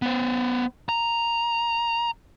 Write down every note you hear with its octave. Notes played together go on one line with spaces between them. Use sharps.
B3 C5
A#5